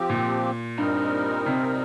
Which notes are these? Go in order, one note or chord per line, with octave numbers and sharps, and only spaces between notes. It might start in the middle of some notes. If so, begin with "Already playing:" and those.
Already playing: F3 C4 G4
A#2
G2 A#2 G3 C4 D#4 A#4
C3